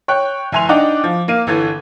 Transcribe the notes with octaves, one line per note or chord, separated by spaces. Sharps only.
C#5 G5 F#6
F1 E4 G#5 C6 F7
D4 D#4 D#5 F#5 G5 D6
F3
A#3 F5 D#7
G1 E3 A4 G#6